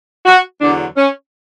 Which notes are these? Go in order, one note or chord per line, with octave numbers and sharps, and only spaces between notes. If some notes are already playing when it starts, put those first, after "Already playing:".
F#4
E2 D3 F#3 D4
C#4